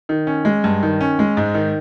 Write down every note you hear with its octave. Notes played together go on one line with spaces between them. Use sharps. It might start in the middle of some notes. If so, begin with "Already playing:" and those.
D#3
C#4
G#3
G2
D#3
C#4
G#3
G#2
D#3